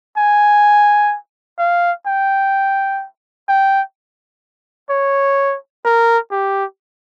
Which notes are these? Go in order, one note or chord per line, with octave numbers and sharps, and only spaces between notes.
G#5
F5
G5
G5
C#5
A#4
G4